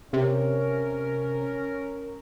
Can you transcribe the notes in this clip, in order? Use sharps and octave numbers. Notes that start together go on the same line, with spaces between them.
C3 C#4 A#4